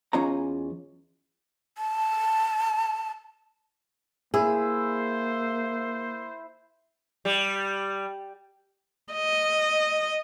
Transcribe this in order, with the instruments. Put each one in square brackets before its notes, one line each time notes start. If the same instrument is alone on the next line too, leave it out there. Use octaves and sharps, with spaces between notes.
[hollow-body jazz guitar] E2 C#4 F4 C#5 D#5 A#5
[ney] A5
[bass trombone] A#3 [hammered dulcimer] E4 [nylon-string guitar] G#4 [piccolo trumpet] C5
[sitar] G3
[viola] D#5